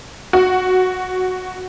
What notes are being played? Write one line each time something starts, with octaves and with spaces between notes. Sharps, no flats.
F#4